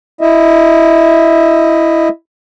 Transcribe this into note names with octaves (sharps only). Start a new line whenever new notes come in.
E4 D#5 E5